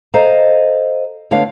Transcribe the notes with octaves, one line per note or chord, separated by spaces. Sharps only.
A4 C5 D#5 F5 A#5
D3 A3 B3 C#5 F5